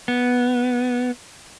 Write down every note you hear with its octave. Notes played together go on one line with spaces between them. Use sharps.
B3